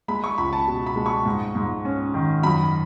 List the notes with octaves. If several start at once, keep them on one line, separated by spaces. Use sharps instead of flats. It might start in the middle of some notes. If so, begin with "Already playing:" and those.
G#3 B5
C#6
C#2 B5
A5
B2
B5
G#3
C#6
G#2
G#2
C#4
D#3
F#2 B5